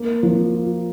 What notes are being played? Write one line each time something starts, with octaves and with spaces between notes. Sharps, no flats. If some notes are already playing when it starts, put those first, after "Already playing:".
Already playing: A#3
F3
F4